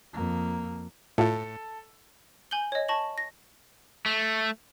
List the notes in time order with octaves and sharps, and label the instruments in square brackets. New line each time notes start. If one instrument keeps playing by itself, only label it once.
[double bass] F2 A#3
[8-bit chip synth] A2 [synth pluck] E4 F4 [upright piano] A4
[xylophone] G#5 G6 F#7 G7
C#5 D#5
A5 C#6 A#6 F#7
A#6
[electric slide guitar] A3